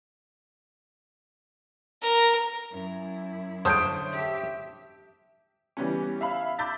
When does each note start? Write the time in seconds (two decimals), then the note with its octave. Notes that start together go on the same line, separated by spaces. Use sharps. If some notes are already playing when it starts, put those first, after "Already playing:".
2.02 A#4
2.72 F#2 E4
3.65 D3 C5 C#5 F5 A5 D#6 G6 D7
4.12 G4 E5
5.77 E3 G3 B3 C#4
6.21 E5 F5 B5
6.59 B5 D6 E6 G6 A6 B6